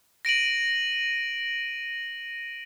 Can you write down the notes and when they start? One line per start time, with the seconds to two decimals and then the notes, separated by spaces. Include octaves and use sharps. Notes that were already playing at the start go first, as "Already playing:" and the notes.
0.25 A#6 D7 D#7 F#7